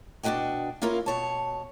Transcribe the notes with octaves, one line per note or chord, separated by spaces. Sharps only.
B2 D4 E4 F#4 D#5 G5
A#3 C#4 E4 F4 A#4 F5
B2 C#5 A5